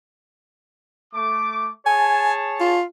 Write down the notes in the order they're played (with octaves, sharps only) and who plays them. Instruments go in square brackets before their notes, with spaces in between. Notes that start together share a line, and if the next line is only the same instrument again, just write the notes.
[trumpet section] A3 D6
[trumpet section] G#4 C#5 A5 [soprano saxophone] G#5
[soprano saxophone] F4